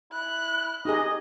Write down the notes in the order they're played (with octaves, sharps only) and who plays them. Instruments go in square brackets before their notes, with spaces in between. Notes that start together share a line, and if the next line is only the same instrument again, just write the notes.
[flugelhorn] E4 [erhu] F#6
[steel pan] D#4 G4 G#4 [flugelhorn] D#5